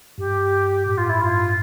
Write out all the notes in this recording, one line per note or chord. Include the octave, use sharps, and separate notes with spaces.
G2 G4
A2 G4
F4
G2
E4
G2 F4